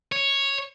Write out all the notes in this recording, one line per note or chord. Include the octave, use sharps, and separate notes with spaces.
C#5